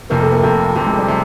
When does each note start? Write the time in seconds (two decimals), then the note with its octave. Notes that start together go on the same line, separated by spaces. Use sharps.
0.10 F1 F2 C3 A#3
0.21 A3
0.32 A#3
0.43 F1 F2 C3 A#3
0.75 F1 F2 C3 A3
0.86 G#3
0.97 G3
1.08 C3